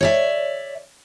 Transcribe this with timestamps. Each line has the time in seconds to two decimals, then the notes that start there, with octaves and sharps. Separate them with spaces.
0.01 C#5 D5 E5